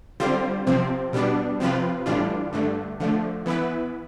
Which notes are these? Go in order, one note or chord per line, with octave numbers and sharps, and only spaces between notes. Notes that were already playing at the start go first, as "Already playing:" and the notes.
D3 G3 C4 F4 C5
C3 F3 C4
B2 G3 B3 D4
C3 F3 C4 F4 B4
A2 E3 G3 D4 F4
G2 D3 A3
D3 F3 A3
E3 B3 E4 B4